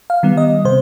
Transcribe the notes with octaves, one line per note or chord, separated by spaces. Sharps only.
F5
D#3 G3 B3
D#5
C3 C5